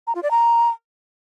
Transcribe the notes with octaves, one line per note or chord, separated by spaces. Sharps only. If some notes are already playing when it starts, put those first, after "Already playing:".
A#5
F4
D5
A#5